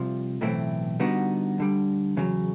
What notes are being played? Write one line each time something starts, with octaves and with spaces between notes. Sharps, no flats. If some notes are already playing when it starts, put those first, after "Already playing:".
Already playing: C2 C3 F3
B1 A2 E3 A3 C4
D3 G3 B3 D#4 F#4
D2 D3 G3
E2 C#3 F#3